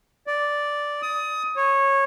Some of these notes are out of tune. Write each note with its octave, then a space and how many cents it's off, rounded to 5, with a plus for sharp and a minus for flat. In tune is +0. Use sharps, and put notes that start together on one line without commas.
D5 -5
D#6 +20
C#5 -15